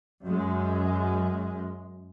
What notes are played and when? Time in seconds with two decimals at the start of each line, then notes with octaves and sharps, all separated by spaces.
0.24 F#2 G#3